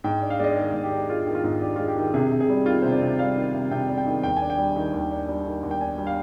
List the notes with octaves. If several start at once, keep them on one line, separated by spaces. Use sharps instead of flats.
G#2 G5
D4
F5
G#3 D5 D#5
D#3 G#4
G#2
G4
D4
G#3 F4
D#3
F4
G#2
D4 G4
G#3 F4
G4
D#3
C3 G#4
C3
G#4
G3
D#3 F4
C3 C5
D5
C3
G3 F5
D#3
C3
C3 G5
G3
G5
D#3
D#2 G5
D4 G#5
G5
G3
D#3
D#2
D4
G3
D#3
D#2
G5
D4 G#5
G3
F5